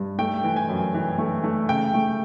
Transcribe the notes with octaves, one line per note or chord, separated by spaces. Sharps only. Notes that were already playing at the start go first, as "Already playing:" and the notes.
Already playing: G2
A3 G5
E3
G#5
F#2
E3
A3
A3
C#3 G5
A3